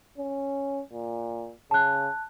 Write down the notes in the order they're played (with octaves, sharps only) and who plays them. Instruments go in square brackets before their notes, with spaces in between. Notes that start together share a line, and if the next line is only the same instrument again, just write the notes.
[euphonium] C#4
A#2
[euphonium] C#3 [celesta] A5 F#6